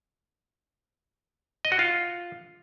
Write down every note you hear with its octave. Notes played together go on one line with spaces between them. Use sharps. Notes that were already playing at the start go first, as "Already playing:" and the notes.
D#5
F#4
F4